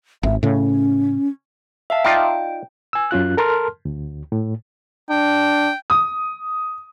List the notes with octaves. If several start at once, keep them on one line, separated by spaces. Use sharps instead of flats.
G#1 E5
A2 C#3 C#4
E5 F5 A5
D#4 F4 D5 G5
G#5 E6
F#2 C#4 F4 F#6
A4 A#4 A5 C6 F6
D2
A2
D4 G5
D#6